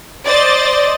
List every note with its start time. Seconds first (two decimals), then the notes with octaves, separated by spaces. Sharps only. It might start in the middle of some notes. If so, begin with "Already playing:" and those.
0.26 C5 D5 D#5 A6